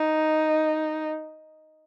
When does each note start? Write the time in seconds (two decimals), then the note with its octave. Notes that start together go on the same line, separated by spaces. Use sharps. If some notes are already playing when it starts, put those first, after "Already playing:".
Already playing: D#4